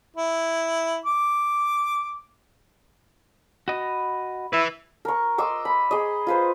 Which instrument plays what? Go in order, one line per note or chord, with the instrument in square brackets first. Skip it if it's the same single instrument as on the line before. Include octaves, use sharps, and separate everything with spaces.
[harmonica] E4
D6
[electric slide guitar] F#4 D#5 [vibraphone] B5
[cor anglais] E4 [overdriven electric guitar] B4 E5
[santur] A#4 C#6
D#5 C6 D6 E6
B5
G#4 D#5
F4 B4 C5